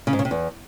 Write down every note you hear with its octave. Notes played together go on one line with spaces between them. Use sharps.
C#3
G#2
C#3
C3
E2